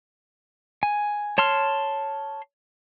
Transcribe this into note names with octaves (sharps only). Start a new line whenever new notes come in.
G#5
C#5 A5 C6 F6